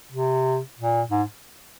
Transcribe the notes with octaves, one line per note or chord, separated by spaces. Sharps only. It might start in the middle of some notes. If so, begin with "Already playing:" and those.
C3
A#2
G#2